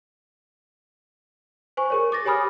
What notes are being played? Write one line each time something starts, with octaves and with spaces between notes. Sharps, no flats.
C5 G#5 C#6
G#4 A#4 C#5
D6 A6 A#6
G4 C#5 G#5 B5 D#6 F6